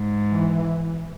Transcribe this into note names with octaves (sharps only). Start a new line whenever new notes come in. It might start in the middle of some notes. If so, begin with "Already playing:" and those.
Already playing: G#2
E3